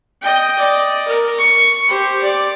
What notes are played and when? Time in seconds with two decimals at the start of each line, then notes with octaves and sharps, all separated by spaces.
0.22 D#5 G5
0.57 D5 D#5
1.07 A#4
1.39 C#6
1.87 G4 C5
2.22 D5 D6